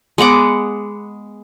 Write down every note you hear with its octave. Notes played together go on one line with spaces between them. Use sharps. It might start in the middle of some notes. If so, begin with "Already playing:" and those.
G#3 B3 F#5 D6